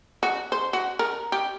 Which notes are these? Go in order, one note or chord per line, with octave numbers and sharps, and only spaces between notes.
F#4
C5
F#4
A#4
G4